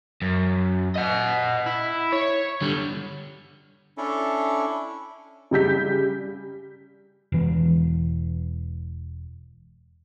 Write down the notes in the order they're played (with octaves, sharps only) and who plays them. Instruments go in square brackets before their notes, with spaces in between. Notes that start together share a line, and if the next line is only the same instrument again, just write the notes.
[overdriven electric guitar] F#2
D#5 F#5
E4
C#5
D3 G3
[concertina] C#4 D4 E4 A4
[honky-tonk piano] C#3 G3 G6 B6
[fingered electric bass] E1 E3